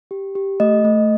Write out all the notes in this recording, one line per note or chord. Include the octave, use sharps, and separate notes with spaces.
G4
G4
A3 D#5
A3